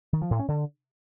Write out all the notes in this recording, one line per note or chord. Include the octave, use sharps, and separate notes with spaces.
D#3
F3
A2
C#4
D3